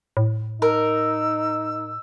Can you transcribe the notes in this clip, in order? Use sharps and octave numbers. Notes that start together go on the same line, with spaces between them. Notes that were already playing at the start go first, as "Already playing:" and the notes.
A2
D#4 A#4 E6